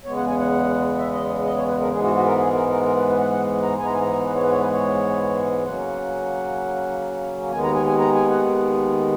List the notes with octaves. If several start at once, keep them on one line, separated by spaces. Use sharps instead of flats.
E2 C#3 G#3 B3 C#5
F#5
G#5
F#5
E5
D#5
D#5
C#5
B4
A#4
G#2 E3 G#3 B3 G#4
F#4
F#4
A#4
G#4
A#4
A#4
A#4
B4
B4
F#5
F#5
A#5
G#2 E3 G#3 B3 G#5
A#5
G#5
A#5
B4
C#5
B4
C#5
B4
C#5
C#3 F#3 A#3 C#4 F#5
D#2 D#3 G#3 B3 G#5
A#5
G#5
G#5
A#5
G#5
F#5